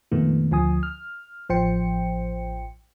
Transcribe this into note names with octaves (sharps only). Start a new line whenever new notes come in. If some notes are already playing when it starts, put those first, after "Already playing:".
F2 A#2 D#3 A3 B3
D2 F3 G#5 D#6
F6
A1 F3 C5 G5 C#7